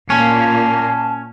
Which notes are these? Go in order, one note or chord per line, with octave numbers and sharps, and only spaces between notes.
A#2 A#3 C#4 A5